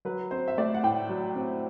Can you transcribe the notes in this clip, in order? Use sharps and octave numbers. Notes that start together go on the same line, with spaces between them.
F#3 B4
C4 C5
E5
A3 D5
F#5
A2 G5
F#3
C4